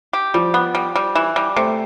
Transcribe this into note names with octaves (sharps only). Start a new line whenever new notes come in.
G4
F3 G3
B3
G3
G3
E3
G3
C3 A3